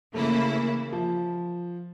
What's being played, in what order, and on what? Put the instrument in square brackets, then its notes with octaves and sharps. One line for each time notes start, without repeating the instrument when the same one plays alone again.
[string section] C#3 E3 A#3 E4 [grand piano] A3
[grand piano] F3